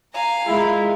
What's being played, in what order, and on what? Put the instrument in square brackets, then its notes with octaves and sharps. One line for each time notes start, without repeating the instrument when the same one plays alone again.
[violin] F5 [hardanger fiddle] G#5 A#5
[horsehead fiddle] G#3 [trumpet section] E4 [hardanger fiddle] F4 A#4